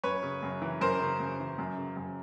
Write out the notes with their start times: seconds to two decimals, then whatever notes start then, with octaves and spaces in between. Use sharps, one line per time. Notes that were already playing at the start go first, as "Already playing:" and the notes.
0.03 F#2 B4 C#5
0.23 C#3
0.43 F#2
0.62 E3
0.81 F#2 A#4 C5
1.01 C#3
1.20 F#2
1.40 E3
1.58 F#2
1.77 C#3
1.97 F#2